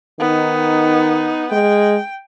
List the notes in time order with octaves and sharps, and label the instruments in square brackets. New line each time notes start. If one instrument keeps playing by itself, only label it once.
[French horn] D#3 [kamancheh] B3 D#4
[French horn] G#3 [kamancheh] G5